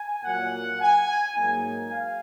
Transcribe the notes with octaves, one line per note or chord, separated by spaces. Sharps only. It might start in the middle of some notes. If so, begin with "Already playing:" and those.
Already playing: G#5
A#2 F#3 A#3 F#5
G#5
G#2 F#3 A#3 D#4 G#5
F5